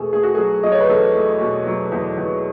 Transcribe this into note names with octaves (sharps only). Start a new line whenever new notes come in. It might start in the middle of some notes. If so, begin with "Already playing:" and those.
Already playing: E2 B2 A3 G#4 A4
A3 G#4
F#4
F#3 G#4
F#3 D#5
C#5
B4
E2 A4
A3
B2
F#3
E2
E2